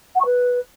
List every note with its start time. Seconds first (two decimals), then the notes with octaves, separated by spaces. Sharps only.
0.15 F#5
0.20 C#6
0.25 B4